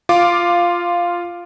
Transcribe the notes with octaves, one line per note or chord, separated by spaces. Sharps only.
F4 F5 D6